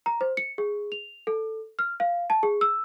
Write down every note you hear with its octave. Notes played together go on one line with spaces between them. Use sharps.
A#5
C5
C#7
G#4
F7
A4
F6
F5
A5
G#4
E6